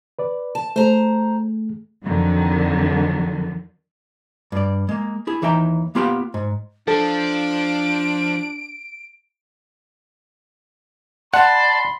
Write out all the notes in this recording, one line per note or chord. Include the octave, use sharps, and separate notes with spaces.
B4 D5
A5
A3 G#4 C5 A#5
F2 D3 D#3 F#3
G2 D5
G#3 A#3
E4 G#4
D#2 E3 D#4 E5 G5 A#5
A#3 B3 F4 G4 F5 G5
G#2
F3 D4 A4 D7
D5 F#5 A5 B5 C6